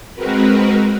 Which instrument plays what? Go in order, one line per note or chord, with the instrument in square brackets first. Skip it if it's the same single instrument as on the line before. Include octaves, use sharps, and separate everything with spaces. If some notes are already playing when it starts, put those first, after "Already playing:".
[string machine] G#3 C4 F#4 A#4 B4